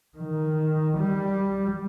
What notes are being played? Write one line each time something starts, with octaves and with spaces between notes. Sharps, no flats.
D#3
G3